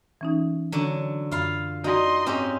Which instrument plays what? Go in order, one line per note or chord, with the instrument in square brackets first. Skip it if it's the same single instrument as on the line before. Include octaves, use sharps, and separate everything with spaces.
[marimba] E3 C#4 D#4
[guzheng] D3 F#3
[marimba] F#2 B5 [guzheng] F4 F5
[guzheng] D#4 [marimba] F#4 D5 [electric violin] D#5 C6
[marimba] G#2 [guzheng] C4 C#4 G4